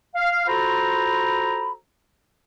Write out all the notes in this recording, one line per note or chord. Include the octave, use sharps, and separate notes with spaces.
F5
F4 F#4 A4 C5 A#5 B5